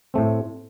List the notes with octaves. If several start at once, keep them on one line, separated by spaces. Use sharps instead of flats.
A2 A3 C4